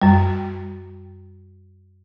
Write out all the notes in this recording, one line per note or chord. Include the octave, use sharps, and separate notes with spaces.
F#2 G3